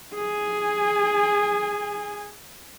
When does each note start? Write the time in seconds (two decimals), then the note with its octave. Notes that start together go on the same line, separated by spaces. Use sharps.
0.14 G#4 G#5